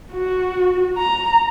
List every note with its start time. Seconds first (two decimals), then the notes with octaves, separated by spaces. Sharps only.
0.12 F#4
0.98 A#5